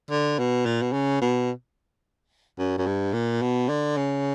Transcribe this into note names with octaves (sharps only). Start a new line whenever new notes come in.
D3
B2
A#2
B2
C#3
B2
F#2
F#2
G2
A#2
B2
D3
C#3